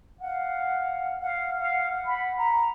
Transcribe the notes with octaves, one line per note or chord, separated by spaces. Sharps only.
F5 F#5
F5 F#5
F5
B5
A#5